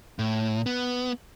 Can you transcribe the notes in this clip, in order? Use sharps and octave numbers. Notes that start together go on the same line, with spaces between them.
A2
B3